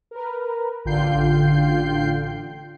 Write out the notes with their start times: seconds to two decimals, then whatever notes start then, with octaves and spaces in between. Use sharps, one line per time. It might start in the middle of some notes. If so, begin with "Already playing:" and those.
0.11 A#4 B4
0.85 A1 D3 F4 G5 G6 C7